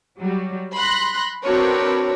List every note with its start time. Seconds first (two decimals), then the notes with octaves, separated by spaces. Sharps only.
0.20 F#3 G3
0.75 B5 C6 F#6 A#6
1.43 C4 D4 F#4 A#4 B4 C#5